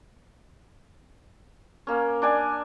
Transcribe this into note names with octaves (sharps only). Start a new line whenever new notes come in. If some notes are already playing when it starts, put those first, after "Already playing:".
A#3 C#4
D4 D5 G#5